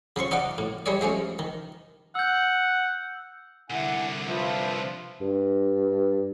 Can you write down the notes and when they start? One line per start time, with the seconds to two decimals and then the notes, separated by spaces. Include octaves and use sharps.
0.16 C#3 F3 C6 C#6
0.31 D#4 D5 F#5 D6
0.58 A2
0.86 G3 G#3 C#5 D5
1.01 F3 G#3 A3 C#4
1.39 D#3
2.15 F#5 E6 G6
3.70 C2 D3 E4 F#5 G#5
4.27 F3 B4 E5
5.21 G2